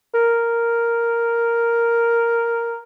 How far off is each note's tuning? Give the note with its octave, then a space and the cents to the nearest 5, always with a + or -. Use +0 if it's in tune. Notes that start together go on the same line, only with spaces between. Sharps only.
A#4 +0